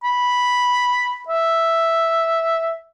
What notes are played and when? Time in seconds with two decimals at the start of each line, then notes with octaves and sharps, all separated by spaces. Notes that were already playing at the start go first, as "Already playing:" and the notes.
0.04 B5
1.28 E5